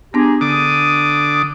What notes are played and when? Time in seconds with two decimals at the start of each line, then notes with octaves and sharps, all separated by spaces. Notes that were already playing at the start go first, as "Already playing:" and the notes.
0.14 B3 D4 G4 G#4 A#5
0.41 D3 D6 D#6